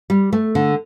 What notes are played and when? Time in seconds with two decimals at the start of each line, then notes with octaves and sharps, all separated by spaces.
0.10 G3
0.33 A3
0.55 D3